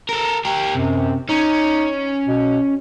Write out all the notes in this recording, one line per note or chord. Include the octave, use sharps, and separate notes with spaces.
A4 A#4
G4 A#4
F#2 C3
C#4 D#4
B2